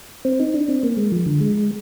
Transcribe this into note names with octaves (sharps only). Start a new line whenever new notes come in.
C4
D#4
D4
C4
A#3
G#3
F3
D3
G#3